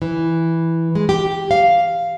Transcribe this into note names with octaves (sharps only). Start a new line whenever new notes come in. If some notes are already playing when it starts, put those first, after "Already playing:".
E3
G#3
G4
F5